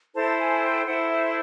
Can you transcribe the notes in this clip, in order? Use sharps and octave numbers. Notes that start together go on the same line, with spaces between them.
E4 A4 C5 A5
G#5
G5
E4 A4 C5 F#5
E5